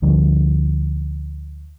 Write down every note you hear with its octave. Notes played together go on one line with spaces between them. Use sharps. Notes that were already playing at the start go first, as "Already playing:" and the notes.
D2 D3 F3 G3